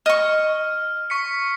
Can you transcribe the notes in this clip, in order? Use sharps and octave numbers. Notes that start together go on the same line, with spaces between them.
D#5 C#6 F6
C#6 B6 C#7